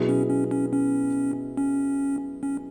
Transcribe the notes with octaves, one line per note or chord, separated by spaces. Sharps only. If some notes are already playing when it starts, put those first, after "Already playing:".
Already playing: B2 F#3 B3 E4 G#4
C#4
C#4
C#4
C#4
C#4
C#4